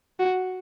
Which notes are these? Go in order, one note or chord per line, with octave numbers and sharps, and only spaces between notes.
F#4